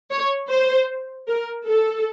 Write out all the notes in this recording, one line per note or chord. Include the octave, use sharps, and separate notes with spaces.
C#5
C5
A#4
A4